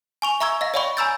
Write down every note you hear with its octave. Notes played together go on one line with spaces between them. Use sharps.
G#5 C#6 F7
E5 A#5 C#6 E6 G#6
D#5 F5 A#6
C#5 D5 F5 G5 B5 C#6
G#5 A#5 B5 E6 G6 A6